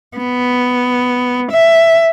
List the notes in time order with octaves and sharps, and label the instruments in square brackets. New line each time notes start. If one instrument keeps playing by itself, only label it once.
[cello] B3
E5